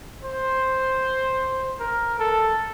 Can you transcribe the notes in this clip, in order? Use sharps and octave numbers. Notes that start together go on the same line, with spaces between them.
C5
A#4
A4